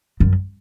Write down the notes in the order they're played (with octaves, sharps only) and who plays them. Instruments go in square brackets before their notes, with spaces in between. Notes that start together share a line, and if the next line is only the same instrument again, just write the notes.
[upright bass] F#2